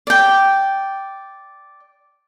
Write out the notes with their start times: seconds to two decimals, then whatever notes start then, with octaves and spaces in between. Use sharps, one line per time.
0.07 D5 G5